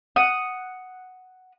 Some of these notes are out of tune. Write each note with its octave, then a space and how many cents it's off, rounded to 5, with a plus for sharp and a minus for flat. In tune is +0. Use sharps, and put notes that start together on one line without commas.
F#5 +0 D#6 +0